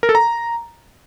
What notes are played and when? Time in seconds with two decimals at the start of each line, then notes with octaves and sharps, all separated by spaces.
0.03 A#4
0.09 A4
0.15 A#5